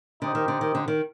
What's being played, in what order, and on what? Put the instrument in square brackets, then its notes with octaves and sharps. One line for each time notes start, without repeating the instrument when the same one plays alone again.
[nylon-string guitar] D3 [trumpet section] D#4 G4 C5 D#5
[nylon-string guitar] D#3
D3
D#3
D3
D#3